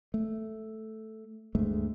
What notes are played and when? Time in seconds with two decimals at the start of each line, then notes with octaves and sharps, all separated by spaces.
0.14 A3
1.55 D2 G2 G#3 A3